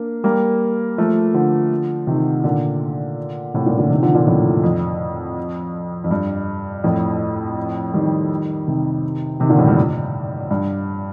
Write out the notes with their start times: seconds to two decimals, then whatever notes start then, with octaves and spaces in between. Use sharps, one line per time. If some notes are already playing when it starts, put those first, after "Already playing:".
Already playing: A#3 D4
0.24 G3 A#3
0.98 F3 A3
1.34 D3 F3
2.07 C3 D#3
2.44 A#2 D3
3.54 A2 C3
3.66 G2 A#2
3.78 A#2 D3
3.90 C3 D#3
4.02 D3 F3
4.15 A#2 D3
4.27 F2 A2
4.64 F2
6.04 F2
6.11 G2
6.84 F2 A2
7.93 D#3 G3
8.67 C3 D#3
9.40 C3 D#3
9.50 A#2 D3
9.58 F2 A2
9.68 G2
10.51 G2